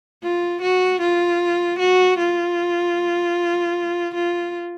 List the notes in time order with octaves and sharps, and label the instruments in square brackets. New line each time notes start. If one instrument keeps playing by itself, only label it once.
[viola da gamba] F4
F#4
F4
F#4
F4
F4